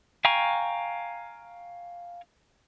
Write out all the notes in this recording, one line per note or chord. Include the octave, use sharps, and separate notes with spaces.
F5 G5 G#5 A#5 C#6